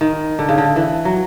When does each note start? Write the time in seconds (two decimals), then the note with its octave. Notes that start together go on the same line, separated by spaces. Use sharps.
0.01 D#3
0.39 D3
0.49 C#3
0.58 D3
0.76 E3
1.05 F#3